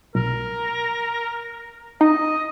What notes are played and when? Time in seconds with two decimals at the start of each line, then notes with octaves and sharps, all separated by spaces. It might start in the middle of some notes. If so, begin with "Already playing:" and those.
0.15 B1 A#4
2.01 D#4 D#5